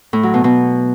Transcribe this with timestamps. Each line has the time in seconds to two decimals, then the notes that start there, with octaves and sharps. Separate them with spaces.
0.13 A2
0.23 F#3
0.34 B2
0.44 B2